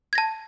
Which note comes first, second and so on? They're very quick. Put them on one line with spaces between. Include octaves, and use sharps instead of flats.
G#6 A#6 A5